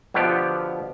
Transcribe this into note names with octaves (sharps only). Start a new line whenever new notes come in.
B2 D3 F3 B3 G4